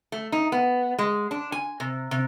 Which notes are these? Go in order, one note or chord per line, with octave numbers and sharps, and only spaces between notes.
A3
D#4
B3
G#3
D4
G#5
C3
C3